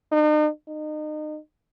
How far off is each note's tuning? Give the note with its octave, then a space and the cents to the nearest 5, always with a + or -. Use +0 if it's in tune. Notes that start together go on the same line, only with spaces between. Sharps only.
D#4 -45
D#4 -30